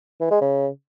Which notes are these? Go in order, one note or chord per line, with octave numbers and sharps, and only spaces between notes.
E3
G#3
C#3